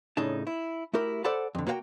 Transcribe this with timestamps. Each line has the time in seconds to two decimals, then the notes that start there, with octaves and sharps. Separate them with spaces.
0.17 A2 C#3 D4 D#4 A5
0.47 E4
0.93 A3 E4 F#4 G4 A#4
1.24 A4 C5 D5 F#5 A5 B5
1.55 F2 D3
1.67 A#3 F#4 C5 F5 G5 A#5